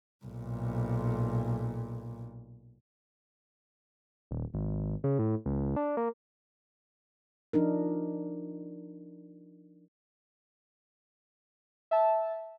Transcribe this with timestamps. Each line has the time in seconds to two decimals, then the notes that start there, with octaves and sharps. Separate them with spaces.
0.25 B1 A#2
4.31 D#1
4.54 G#1
5.04 C#3
5.19 A2
5.46 C#2
5.76 D4
5.97 A#3
7.53 F3 D4 D#4 A#4
11.91 E5 A5